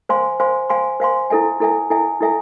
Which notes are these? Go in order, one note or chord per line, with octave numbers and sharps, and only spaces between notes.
C5 F5 G#5 C6
C5 F5 G#5 C6
C5 F5 G#5 C6
C5 F5 G#5 C6
E4 A4 E5 G#5
E4 A4 E5 G#5
E4 A4 E5 G#5
E4 A4 E5 G#5